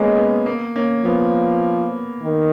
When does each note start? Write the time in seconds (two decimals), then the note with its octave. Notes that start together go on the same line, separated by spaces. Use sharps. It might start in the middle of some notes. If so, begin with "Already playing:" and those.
Already playing: G#3 A#3 B3 C#4 G#4
0.12 C#4
0.17 B3
0.46 A#3
0.76 A#3 C#4
1.04 F3 B3
2.23 D#3